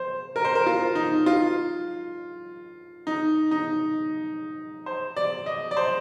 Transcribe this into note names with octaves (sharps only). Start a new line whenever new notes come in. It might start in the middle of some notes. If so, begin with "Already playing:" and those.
Already playing: C5
A#4
C5
A#4
F4
D#4
F4
D#4
D#4
C5
D5
D#5
D5
C5